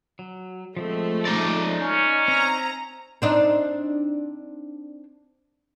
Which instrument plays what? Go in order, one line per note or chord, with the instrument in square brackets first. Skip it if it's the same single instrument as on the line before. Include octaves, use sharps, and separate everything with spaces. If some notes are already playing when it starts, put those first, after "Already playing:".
[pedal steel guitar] F#3
[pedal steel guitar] F3 G#3 C4 [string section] A3
[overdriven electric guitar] D#4 D5
[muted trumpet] C#4
[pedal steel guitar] C4 G#5 [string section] A#5
[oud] C4 D4 D#4